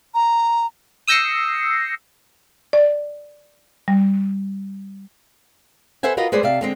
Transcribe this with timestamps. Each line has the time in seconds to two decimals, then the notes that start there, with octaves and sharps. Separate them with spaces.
0.15 A#5
1.07 D#6 E6 G6 A#6 C7 C#7
2.73 D5
3.88 G3
6.03 A4 B4 C5 E5 F#5 G#5
6.17 F4 F#4 A#4 B4 D#5
6.32 G#3 G#4 B4 C5 D5
6.43 C3 D5 E5 F5 A5
6.61 D3 G#3 C4